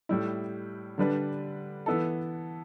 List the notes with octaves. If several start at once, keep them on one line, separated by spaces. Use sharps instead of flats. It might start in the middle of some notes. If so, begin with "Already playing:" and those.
A2 G3 E4
D3 G3 D4 B4
E3 B3 E4 A4